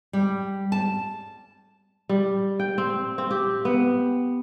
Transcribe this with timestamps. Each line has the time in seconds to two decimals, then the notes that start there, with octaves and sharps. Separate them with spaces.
0.13 G3
0.72 A5
2.09 G3
2.60 G5
2.78 C4
3.18 C4
3.31 G4
3.65 B3